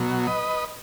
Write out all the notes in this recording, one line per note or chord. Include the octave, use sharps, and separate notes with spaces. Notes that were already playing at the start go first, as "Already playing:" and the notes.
Already playing: B2 F#3
B4 D#5